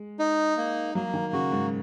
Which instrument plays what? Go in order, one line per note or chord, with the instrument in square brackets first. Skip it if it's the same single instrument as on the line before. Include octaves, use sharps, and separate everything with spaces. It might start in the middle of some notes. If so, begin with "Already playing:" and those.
Already playing: [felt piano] G#3
[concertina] D#4
A#3
[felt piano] F#3 [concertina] A#3
[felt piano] D#3
[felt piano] C#3 [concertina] F#4
[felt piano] G#2